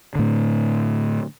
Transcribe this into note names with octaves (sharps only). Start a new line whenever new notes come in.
A2 D3